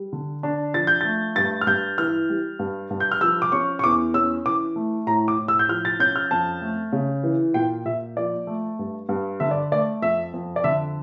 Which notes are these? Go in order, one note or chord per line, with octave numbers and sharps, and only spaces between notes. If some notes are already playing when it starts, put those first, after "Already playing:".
Already playing: G3
D3
D4
F3 A6
G6
A3 A6
G2 A6
F6
G2 G6
E3 F6
G3
G2
G2
G6
F6
F3 E6
D6
C#4 C#6
C#6
E2 D6
C#4 E6
E3 D6
A3
A2 A#5
D6
A2
E6
G6
F3 F6
A6
C#4 G6
F6
F2 A5
A3
C#3
E3
A#2 G5
A#2 E5
F3 D5
A3
G2
G2
D3 E5
D5
A3 D5
F2 E5
F2
D5
D3 E5